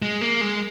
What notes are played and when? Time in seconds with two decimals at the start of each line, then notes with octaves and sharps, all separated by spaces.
0.02 G#3
0.21 A#3
0.41 G#3